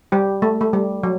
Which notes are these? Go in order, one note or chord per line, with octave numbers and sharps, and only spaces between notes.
G3 G4
A3
A3
G3
F#3